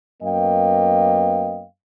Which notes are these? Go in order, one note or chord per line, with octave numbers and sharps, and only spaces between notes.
F#2 A#3 B3 D#5 F5 G5